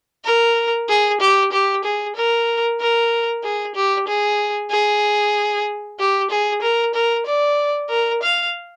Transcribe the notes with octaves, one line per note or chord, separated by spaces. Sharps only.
A#4
G#4
G4
G4
G#4
A#4
A#4
G#4
G4
G#4
G#4
G4
G#4
A#4
A#4
D5
A#4
F5